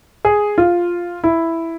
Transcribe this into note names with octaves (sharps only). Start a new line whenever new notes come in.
G#4
F4
E4